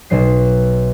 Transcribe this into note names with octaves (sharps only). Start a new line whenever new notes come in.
B1 B2 F#3 C7